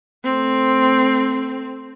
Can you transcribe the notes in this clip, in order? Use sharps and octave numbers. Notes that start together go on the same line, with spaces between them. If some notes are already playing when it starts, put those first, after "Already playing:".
A3 C4